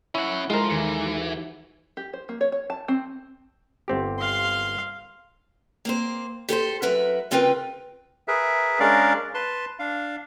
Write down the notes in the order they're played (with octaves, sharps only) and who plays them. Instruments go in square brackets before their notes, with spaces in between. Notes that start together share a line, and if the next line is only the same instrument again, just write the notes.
[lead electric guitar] C#4 F#5 [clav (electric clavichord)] E4
[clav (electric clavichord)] G#3 A#4 [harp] E4 A4 [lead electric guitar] F4 C5
[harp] D#2 [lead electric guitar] E3
[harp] F#4
[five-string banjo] G4
C5
A#3
C#5
C#5
A5
C4
[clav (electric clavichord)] G1 C4 G4
[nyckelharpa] F5 C6
[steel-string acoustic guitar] A#3 C4 C5
G4 A4 B4 C5
F#2 A#4 B4 E5 F#5
C#3 C4 F4 A#4 B4 G5
[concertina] G#4 A#4 B4 E5
G#3 C#4 D4 A#4 D5 F5
B4 A5 C6
D4 F5